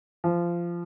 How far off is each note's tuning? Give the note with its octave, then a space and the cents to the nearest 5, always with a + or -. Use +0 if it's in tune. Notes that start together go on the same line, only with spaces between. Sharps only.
F3 -20